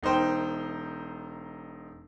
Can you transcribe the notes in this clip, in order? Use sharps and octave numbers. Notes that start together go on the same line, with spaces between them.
E1 D#4 A#4 C5 G5